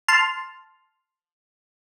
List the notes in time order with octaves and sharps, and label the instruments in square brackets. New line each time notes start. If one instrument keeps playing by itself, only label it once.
[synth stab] A5 C6 F6